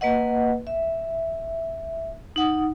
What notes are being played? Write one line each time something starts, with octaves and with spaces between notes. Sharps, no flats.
A#3 B4 D#5 F#5
E5
D#4 F#5 D#6